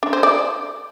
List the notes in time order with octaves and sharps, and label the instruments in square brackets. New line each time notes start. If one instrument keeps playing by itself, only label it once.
[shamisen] D4
C5
D5